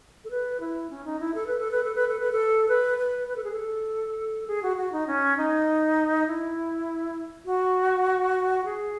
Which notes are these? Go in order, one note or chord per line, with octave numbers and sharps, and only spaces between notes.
A4
B4
E4
C#4
D#4
E4
A4
B4
A4
B4
A4
B4
A4
B4
A4
B4
B4
B4
A4
G#4
A4
G#4
F#4
F#4
D#4
C#4
D#4
E4
F#4
G#4